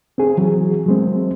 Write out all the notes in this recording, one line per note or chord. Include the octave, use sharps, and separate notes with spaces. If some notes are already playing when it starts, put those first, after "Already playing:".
C4 G#4
E3 F#3
F#3 G#3 C4